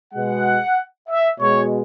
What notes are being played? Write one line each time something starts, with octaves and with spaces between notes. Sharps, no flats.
B2 G#3 F#5
E5
B2 G#3 C#5